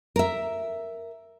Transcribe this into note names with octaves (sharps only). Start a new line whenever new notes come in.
A#4 E5